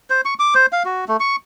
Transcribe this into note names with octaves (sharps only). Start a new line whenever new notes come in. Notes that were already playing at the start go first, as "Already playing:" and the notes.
C5
C#6
D6
C5
F5
F#4
A3
C#6